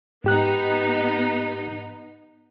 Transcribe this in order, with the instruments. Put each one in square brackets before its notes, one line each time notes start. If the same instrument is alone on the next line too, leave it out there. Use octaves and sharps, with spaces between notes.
[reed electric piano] G#2 G4 F#6 [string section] B3 D#4